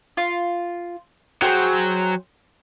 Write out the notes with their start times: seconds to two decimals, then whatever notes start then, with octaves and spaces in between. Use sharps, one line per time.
0.17 F4
1.42 F#3 G#4 C5 G5